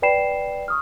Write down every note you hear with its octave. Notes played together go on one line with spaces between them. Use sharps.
B4 D5 G5 B5 C7 E7
C#6 D#6 F6